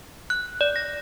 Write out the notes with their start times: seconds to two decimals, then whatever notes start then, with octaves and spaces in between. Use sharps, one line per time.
0.30 F#6
0.61 D5
0.76 A#6